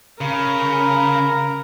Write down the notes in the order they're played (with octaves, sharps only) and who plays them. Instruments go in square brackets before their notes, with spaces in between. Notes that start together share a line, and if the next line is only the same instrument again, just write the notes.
[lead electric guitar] C#3 [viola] A#4 A#5 [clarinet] B5